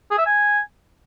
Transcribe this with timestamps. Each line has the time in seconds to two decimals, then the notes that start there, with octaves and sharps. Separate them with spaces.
0.11 G#4
0.18 E5
0.26 G#5